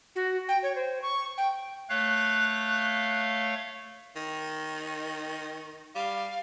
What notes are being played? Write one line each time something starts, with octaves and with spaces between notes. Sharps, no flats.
F#4
G5
C#5
C5
C#6
G5
A3 C#5 F5 F#6
D#3
G3 F5